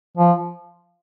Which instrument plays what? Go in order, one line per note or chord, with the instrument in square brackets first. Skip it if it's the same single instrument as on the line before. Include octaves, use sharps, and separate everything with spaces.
[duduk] F3